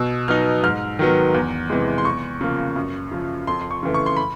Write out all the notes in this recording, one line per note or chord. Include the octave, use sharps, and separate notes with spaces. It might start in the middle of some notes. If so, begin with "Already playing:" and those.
Already playing: B2 E6
F#3 B3 D#4 F6
G#2 F6
D#3 F#3 B3
E2
C3 E3 G#3
C6
E2 C#6
C#3 F3 A#3
F#2
C#3 F3
F2 C6
C6
C#6
C#3 E3 A3
C#6
C6
B5